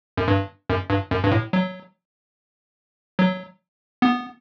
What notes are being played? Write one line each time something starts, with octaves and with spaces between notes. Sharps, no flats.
F#2
G2
F#2
G2
F#2
G2
A2
F#3
F#3
B3